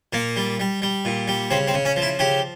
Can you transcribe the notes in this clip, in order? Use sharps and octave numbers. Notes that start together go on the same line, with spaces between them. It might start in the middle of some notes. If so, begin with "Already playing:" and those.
A#2 A#3
G3
G3
G3
A#2
G3
C#3 C4
C4
C#3
C#4
F3
E4
C#3 G4